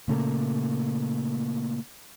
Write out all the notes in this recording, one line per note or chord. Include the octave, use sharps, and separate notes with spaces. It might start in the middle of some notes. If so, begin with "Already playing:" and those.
A#2 C#3 A3 A#3